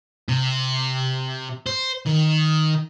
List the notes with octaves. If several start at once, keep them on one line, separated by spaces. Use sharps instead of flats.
C3
C5
D#3